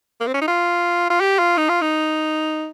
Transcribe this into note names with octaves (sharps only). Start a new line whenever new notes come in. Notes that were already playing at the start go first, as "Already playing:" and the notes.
A#3
C4
C#4
D#4
F4
F4
G4
F4
D#4
F4
D#4